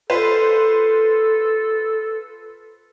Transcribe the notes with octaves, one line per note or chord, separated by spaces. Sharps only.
F4 A4 B4 C5